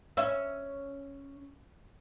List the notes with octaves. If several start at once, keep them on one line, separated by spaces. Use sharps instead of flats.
C#4 E5